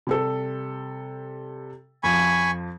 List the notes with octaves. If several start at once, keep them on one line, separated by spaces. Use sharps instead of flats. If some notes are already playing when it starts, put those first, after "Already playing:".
C3 G3 A4
F2 F3 G#5 B5 C#6